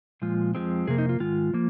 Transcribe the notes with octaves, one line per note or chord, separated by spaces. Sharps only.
A#2 F3 G#3 F4
F2 F3 G#3 C4
F2 C3 A#3 G#4
D#4
F4
G#2 D#3 G#3 F4
F3 A#3